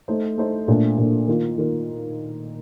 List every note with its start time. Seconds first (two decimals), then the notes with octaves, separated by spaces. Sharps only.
0.08 A3 D#4 A4 C5
0.38 A3 D#4 A4 C5
0.68 A#2 A3 D4
0.98 A#2 A3 D4
1.28 D#3 A#3 F4
1.58 D#3 A#3 F4